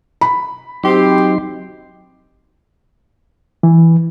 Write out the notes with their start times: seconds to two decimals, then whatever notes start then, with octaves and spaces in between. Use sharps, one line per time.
0.21 B5
0.84 F#3 C4 D#4 G4 C6
3.63 E3